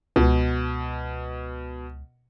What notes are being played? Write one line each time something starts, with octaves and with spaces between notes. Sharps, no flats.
C#2 B2